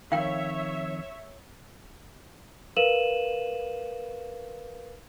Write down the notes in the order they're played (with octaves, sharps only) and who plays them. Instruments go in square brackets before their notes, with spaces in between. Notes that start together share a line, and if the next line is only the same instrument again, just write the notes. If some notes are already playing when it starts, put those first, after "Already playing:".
[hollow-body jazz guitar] F2 G#2 D#3 [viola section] C#5 E5 [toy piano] F5 G5
[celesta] A#4 B4 F5 D#7 E7 F#7